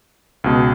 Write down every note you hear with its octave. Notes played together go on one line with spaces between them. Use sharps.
C#2 B2